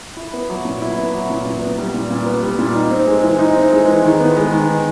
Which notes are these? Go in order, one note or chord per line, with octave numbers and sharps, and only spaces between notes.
E4
B3
F#3
A#2
E4
B3
F#3
A#2
A#2
B3
G3
A#2
A#2
B3
G3
A#2
D#4
C4
G#3
E3
D#4
C4
G#3
E3
D#3
B3
G#3
D#3
D#3